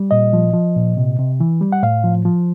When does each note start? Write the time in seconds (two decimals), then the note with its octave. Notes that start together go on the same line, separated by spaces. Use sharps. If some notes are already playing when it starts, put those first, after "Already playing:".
Already playing: G3
0.11 A#2 D#5
0.33 F3
0.54 F3
0.76 A#2
0.97 C3
1.19 C3
1.40 E3
1.61 G3
1.72 F#5
1.83 A2 F5
2.04 F3
2.25 F3